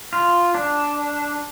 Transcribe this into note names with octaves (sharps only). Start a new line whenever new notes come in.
F4
D4